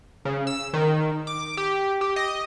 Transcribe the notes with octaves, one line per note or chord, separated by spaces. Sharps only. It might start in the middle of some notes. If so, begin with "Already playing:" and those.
C#3
E6
D#3
D6
G4
G4
D#5